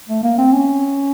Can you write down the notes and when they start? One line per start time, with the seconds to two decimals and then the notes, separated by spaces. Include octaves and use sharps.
0.09 A3
0.24 A#3
0.38 C4
0.53 C#4